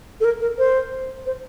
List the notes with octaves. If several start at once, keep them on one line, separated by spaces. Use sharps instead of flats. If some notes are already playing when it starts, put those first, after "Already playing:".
A4
A#4
A#4
C5
C5